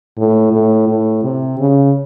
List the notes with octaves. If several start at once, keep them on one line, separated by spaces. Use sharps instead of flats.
A2
A2
A2
C3
C#3